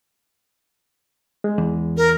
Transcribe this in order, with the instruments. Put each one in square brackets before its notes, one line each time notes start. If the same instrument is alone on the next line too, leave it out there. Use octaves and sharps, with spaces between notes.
[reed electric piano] G#3
[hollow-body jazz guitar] E2
[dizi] A#4